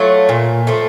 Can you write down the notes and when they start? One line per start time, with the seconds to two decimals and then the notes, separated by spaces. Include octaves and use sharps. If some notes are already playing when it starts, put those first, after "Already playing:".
Already playing: F#3 A3 F4
0.29 A#2
0.67 F3 A3